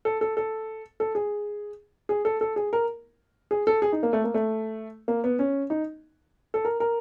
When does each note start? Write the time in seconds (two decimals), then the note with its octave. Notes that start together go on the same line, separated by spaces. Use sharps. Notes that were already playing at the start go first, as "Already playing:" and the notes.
0.05 A4
0.21 A4
0.37 A4
1.00 A4
1.15 G#4
2.09 G#4
2.25 A4
2.41 A4
2.56 G#4
2.73 A#4
3.51 G#4
3.67 A4
3.82 G#4
3.93 D#4
4.03 A#3
4.13 A3
4.24 A#3
4.34 A3
5.08 A#3
5.24 B3
5.39 C#4
5.70 D#4
6.54 A4
6.65 A#4
6.80 A#4